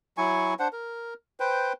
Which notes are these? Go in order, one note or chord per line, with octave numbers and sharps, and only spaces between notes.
F#3 E4 G#5 C#6
D4 C5 F#5
A#4
B4 C5 G5